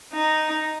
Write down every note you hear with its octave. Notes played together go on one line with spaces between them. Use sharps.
D#4